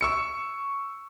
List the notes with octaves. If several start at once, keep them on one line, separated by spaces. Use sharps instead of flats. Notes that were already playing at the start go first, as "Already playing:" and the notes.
C#6 E6 C#7